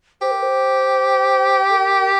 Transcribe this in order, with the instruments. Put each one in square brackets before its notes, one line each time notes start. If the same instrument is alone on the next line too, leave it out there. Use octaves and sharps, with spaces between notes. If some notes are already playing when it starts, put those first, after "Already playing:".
[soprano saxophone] G4 [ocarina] C5
[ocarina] A#4
C5
A4
A#4